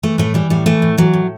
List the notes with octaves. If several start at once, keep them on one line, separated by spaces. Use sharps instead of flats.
E3 A3
A2 A3
E3 G3
A2 G3
E3 A3
A2
E3 F#3
A2